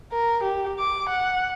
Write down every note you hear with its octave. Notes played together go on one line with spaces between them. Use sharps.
A#4
G4
D6
F#5